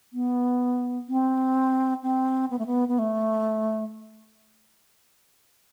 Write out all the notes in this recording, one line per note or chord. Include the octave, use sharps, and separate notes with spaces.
B3
C4
C4
B3
A3
B3
B3
A3